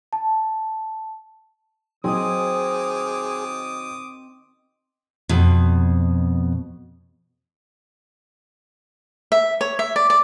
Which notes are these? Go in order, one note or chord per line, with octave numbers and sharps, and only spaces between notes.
A5
D#3 F#3 C4 G#4 D#5 D6 D#6
F2 B2
E5
C#5
E5
D5
D5